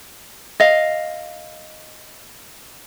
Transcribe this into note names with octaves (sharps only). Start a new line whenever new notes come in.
D#5 F5